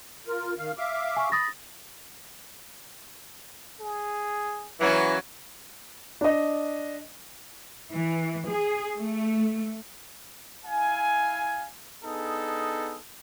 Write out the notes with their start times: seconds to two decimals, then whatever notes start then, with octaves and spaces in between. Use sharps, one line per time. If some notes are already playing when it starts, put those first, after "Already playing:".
0.27 F4 A#4
0.58 D#3 F5
0.78 E5 F5 D6
1.16 G#5 C#6
1.32 B5 D#6 A6 A#6
3.81 G#4
4.81 E3 F#3 A#3 C#4 C#5
6.21 D4 D#5
7.92 E3
8.48 G#4
8.97 A3
10.64 E4 F5 G#5
12.03 B3 D4 D#4 G#4 A4